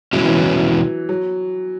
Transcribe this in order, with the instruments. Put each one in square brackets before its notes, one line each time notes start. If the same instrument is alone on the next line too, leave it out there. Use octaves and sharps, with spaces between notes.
[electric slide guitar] E2 B2 G#3 C#4 E4 [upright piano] F#3
[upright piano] E3
F#3
F#3